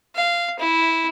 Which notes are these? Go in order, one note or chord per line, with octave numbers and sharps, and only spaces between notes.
F5
E4